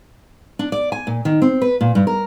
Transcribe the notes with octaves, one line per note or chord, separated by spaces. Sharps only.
D4
D5
G#5
A#2
D#3
C4
B4
A#2
G2
A#4